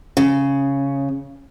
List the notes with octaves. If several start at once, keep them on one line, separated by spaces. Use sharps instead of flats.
C#3